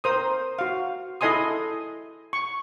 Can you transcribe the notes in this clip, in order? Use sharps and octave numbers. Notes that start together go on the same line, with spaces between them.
A#4 C5 D#6
F#4 F5
E4 A4 D#5 G#5 C6 D#6
C#6